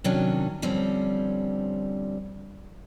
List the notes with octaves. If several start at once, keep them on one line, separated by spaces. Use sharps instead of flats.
C3 D#3 F#3 C#4 D4
D3 F3 G3 C4 C#4